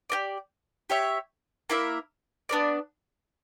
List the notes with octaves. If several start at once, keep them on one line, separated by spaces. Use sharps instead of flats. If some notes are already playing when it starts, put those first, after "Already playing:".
G4 A#4 D5
G4 C#5 E5
A#3 E4 A#4 E5
B3 D4 A#4 D5